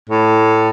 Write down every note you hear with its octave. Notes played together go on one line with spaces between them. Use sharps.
A2